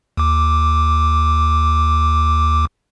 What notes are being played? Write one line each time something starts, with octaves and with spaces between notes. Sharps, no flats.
D#2 D6